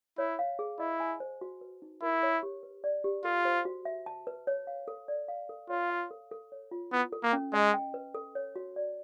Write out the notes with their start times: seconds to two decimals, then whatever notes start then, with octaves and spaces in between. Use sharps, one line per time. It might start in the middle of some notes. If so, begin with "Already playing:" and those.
0.18 E4 C#5
0.39 F5
0.59 G#4
0.79 E4 D#5
1.00 G#5
1.20 C5
1.41 F#4
1.61 B4
1.82 D#4
2.02 E4 A#4
2.23 C#5
2.43 G4
2.63 B4
2.84 D5
3.04 G4
3.24 F4 A4
3.45 C5
3.65 F#4
3.85 E5
4.06 A5
4.27 B4
4.47 C#5
4.67 F5
4.88 A4
5.08 D5
5.28 F5
5.49 A4
5.69 F4 C#5
5.90 F5
6.11 A4
6.31 A4
6.52 C#5
6.71 F4
6.92 B3 E4
7.12 A4
7.23 A#3
7.33 C#4
7.53 G#3 D#5
7.74 G5
7.94 B4
8.14 A4
8.35 C#5
8.56 F#4
8.76 D5